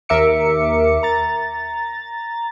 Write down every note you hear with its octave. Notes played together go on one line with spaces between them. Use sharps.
D#2 A#4 E5 D6 C#7
A#5 A6